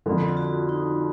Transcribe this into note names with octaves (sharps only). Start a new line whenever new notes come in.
F2 D3 F3
F4
F#4
D#4